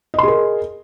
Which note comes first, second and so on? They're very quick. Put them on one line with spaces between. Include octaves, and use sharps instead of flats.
D#5 C6 G#4 A#4